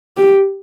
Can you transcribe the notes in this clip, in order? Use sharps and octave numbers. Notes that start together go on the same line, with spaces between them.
G4